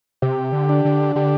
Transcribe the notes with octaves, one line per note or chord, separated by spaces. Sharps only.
C3 G4
D3
D4
D3
D3 G4